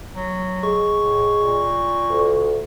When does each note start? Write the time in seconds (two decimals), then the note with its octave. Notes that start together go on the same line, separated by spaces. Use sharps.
0.15 F#3
0.63 G#3 C#6
0.94 A2
1.35 A#2
2.10 D2